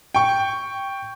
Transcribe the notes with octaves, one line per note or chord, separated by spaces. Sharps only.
G5 C#6